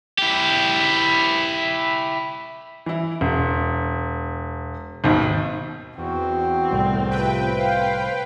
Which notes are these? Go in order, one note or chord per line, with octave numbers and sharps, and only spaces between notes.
E4 G4
E3 E4
E1
G#1 D#2 B2
E2 C4 F#4
C2 A2
C3 F3 B4 G5
C5 F5